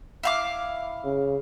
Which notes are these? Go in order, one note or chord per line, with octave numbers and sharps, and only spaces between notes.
E4 F5 D6
C#3